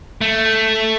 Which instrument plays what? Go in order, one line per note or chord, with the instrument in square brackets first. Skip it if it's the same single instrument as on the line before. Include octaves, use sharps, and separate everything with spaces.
[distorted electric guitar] A3